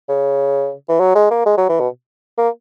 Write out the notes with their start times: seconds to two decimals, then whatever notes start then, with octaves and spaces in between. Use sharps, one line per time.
0.09 C#3
0.89 E3
1.00 F#3
1.15 G#3
1.31 A#3
1.46 G#3
1.57 F#3
1.69 E3
1.80 B2
2.38 A#3